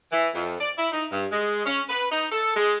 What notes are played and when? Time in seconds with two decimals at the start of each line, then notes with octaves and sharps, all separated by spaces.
0.12 E3
0.34 F2
0.59 D5
0.77 E4
0.92 D#4
1.11 G2
1.30 G#3
1.66 C#4
1.89 B4
2.11 D#4
2.32 A4
2.56 G#3